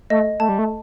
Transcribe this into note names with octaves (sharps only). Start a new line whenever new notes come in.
A3 D#5
A3 A5
G3
A3